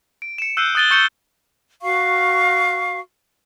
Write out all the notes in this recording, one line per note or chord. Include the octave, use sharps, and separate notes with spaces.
D7
C#7 E7
E6 F#6 G6 C7 D#7 G7
D#6 F#6 A6 D#7 G7
C#6 G6 C#7 D#7 E7 G7
F#4 F5 C#6